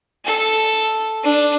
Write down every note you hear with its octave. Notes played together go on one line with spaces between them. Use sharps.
A4
D4